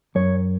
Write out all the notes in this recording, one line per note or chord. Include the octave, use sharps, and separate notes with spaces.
F#2 C#5